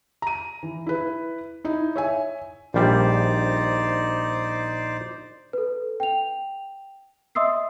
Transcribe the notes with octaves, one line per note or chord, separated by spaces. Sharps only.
A#5 D#7
E3
E4 B4
D#4 E4
C#5 E5 G#5
A#1 G3 D#4 C5 D5
A4 B4
G5 F7
D#5 E5 C6 D#6 E6 C7